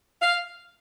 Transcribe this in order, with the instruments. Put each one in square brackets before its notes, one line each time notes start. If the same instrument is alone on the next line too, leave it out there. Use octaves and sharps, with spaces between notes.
[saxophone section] F5